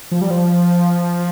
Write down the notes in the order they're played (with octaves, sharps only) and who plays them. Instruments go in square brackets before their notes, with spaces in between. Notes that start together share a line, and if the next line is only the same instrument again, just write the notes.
[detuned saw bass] F3
G3
F3